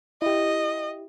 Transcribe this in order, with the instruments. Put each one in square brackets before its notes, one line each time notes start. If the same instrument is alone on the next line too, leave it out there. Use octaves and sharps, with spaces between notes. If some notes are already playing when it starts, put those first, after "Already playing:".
[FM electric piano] E4 G4 [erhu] D#5